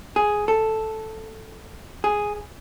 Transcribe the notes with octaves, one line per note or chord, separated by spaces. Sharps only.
G#4
A4
G#4